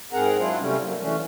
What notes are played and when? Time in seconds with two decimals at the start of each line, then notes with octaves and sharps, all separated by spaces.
0.13 G#2 C4 G#4 A#4 F#5 A#5
0.38 F#3 D4 E4 F4
0.60 C3 G3 A3 C4 C#4
0.83 F#3 A#3
1.01 E3 A3 C#4 D4